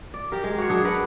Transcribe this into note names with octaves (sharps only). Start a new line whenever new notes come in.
D5
G4 A#4
G#3
F#4 C5 C#5
F#3 D4 G#4
A#4 B4 F#5